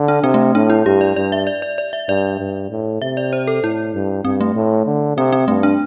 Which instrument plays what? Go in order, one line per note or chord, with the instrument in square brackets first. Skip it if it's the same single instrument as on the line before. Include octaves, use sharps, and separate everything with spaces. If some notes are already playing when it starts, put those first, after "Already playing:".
Already playing: [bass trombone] D3
[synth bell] D4
[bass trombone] C3 [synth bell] C4
[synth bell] A3
[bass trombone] A2 [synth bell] D4
[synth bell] E4
[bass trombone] G2 [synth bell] G4
[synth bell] D5
[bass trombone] G2 [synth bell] D5
[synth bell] E5
D5
D5
D5
E5
[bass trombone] G2 [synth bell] D5
[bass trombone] G2
A2
[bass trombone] C3 [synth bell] E5
[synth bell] D5
C5
A4
[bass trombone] A2 [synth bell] E4
[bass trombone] G2
[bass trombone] G2 [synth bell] C4
[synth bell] A3
[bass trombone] A2
D3
[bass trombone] C3 [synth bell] C4
[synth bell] C4
[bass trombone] G2 [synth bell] A3
[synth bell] D4